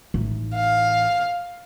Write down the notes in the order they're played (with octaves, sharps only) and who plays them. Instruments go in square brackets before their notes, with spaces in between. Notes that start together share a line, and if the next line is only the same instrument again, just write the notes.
[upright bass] A1 D#4
[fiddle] F5